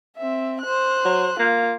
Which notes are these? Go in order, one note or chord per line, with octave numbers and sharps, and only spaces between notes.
C4 E5
C5 F#6
F#3
A#3 F4